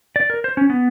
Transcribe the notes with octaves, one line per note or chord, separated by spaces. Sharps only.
D5
A#4
C5
C#4
B3